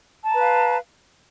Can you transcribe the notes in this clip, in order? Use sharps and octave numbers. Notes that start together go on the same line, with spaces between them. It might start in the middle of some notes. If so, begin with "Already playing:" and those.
B4 F5 A5 A#5